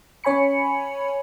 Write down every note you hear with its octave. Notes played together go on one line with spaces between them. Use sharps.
C#4 C#5 G#5 B5 C#7